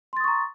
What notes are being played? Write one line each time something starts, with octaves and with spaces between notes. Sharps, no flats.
A#5 C6 C#6 D#6 A6